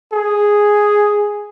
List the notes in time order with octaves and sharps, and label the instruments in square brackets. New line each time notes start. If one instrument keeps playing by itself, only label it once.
[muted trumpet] G#4